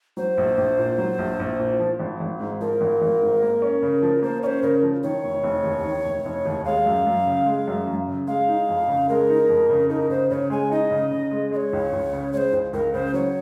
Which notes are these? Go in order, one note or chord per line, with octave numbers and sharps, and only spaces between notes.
F#3 C5
A#1
A#1
A#2
F#3
A#1
A#1
A#2
F3
G#1
G#1
G#2
F3 A#4
G#1
G#1
G#2
A#3
C#4
C#3
F3
A#3 C5
C#4 C5 C#5
C#3 A#4
F3
D#3 C#5
F1
F1
D#2
D#3
F1
F1
D#2
G#3 F5
F#2
F#2
C#3
G#3
F#2
F#2
C#3
G#3 F5
D#4
F2
C#3
G#3 A#4
D#4
F2
C#3
D#4 A#4
C#3 C5
C#3 C#5
G#3 G#5
D#4 D#5
C#3
C#3
G#3
G#3 D#5
C#5
C#2
C#2
C#3
G#3 C5 C#5
C#2
C#2 A#4
C#3 C5
F#3 C#5